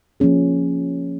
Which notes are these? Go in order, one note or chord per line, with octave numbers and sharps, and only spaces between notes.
F3 A#3 C#4 G#4